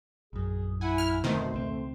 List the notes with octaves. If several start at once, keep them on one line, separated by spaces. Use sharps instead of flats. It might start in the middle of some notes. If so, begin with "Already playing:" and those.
A#1 F#2 G#4
E4 F#5 G#5
F6
D1 F2 B2 D#3 A3 C5
C#2 C4